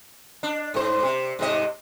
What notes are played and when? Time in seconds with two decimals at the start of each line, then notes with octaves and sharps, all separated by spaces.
0.43 D4
0.74 G#2 C5
1.03 C3
1.39 G#2 C3 D#5